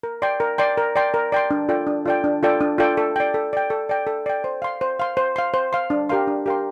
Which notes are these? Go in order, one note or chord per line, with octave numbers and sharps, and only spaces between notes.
A#4
D5 G5 C6
A#4
D5 G5 C6
A#4
D5 G5 C6
A#4
D5 G5 C6
D4
F4 A4 D5 G5
D4
F4 A4 D5 G5
D4
F4 A4 D5 G5
D4
F4 A4 D5 G5
A4
D5 G5
A4
D5 G5
A4
D5 G5
A4
D5 G5
C5
F5 C6
C5
F5 C6
C5
F5 C6
C5
F5 C6
D4
G4 A#4 F5 C6
D4
G4 A#4 F5 C6